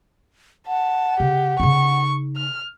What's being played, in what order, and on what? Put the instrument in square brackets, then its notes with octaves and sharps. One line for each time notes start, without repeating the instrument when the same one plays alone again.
[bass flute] F#5 [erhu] A5
[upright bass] C#3 [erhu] G4
[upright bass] C#3 D#4 [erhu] C#6
[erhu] F6